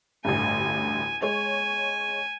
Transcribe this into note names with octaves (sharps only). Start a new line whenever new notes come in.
A1 D2 G2 G#5
G#3 C#5 G#5